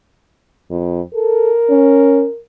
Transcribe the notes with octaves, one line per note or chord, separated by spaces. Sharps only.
F2
A4 A#4
C#4